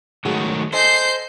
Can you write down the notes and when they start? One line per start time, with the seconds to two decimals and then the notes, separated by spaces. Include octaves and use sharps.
0.25 D#3 F#3 G#3 A3 F#4 G#4
0.73 A4 C5 D#5 G#5 G6 C7